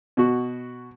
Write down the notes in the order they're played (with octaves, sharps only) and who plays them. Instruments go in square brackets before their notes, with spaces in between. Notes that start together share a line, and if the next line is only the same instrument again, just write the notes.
[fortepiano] B2 F#4